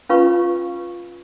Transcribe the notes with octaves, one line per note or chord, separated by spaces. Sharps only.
C#4 F4 B4 F5 B5 C#6